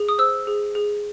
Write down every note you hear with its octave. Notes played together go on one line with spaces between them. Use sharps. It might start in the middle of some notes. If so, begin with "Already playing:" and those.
Already playing: G#4
D#6
C5 E6
G#4
G#4